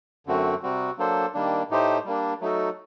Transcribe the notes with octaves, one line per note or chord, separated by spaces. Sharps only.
F#2 D3 A3 C4 F#4
C3 G3 C4 F#4
F#3 A#3 D4 A4 C5
D#3 G3 A#3 D4
A2 A3 D#4 G4 C5
G3 A#3 D4
F#3 A3 D#4 F#4 A4